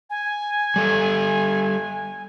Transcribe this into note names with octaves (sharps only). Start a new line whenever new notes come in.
G#5
G3 A4